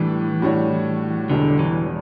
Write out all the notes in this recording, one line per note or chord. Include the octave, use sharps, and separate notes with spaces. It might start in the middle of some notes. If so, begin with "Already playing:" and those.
Already playing: A2 E3 G3 D4
A2 G3 D4 F#4 C#5
E1 E2 B2 D3 G3
E3